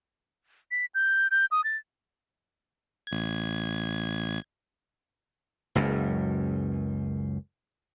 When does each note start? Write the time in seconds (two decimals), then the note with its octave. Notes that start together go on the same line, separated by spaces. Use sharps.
0.71 B6
0.95 G6
1.31 G6
1.51 D#6
1.64 A6
3.07 A1 G#6
5.75 F#1 C#2 F#2